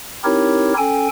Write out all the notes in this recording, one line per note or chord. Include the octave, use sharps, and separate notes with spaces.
C4 D#4 E4 G4 A#4 C#5
C#4 A4 G5 G#5